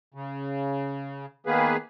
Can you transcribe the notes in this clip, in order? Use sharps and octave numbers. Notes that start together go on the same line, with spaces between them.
C#3
D#3 A#3 B3 G#4 B4